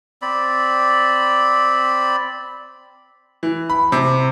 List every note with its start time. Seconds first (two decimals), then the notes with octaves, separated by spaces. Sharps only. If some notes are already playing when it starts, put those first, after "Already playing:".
0.22 C4 D5 B5
3.43 E3
3.70 B5
3.92 C3